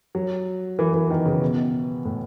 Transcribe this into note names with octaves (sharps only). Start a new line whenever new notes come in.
F#3
E3
E3
D#3
C#3
B2
A2